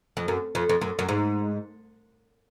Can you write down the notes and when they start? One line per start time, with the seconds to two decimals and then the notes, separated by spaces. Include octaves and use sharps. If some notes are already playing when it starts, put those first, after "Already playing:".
0.17 F2
0.28 F#2
0.55 F2
0.69 F2
0.81 F#2
0.99 F#2
1.09 G#2